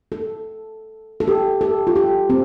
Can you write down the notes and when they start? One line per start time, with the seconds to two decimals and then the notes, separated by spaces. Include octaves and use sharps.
0.12 A4
1.20 A4
1.28 G4
1.61 A4
1.87 F4
1.96 G4
2.30 C4